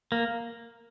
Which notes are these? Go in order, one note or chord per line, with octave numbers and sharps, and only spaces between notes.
A#3